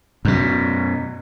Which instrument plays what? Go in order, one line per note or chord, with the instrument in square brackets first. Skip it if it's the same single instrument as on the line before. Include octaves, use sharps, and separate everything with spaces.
[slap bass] F#2 B2